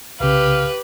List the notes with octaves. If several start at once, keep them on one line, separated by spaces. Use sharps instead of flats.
C2 C#3 G4 B4 F5